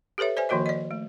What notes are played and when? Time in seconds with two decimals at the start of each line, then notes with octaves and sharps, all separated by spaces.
0.18 G4 A4 B4 C#5 E5
0.37 C5 D5 E5 G#5
0.49 D#3 F3 A#3 F#4 A#4 D#5
0.66 D5 D#5
0.91 A3